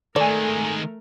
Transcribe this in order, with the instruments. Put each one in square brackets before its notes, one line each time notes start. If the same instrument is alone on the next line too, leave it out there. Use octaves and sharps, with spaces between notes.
[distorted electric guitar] D#3 G#3 [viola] A3 A#4 [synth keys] A4 G#5 [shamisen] D5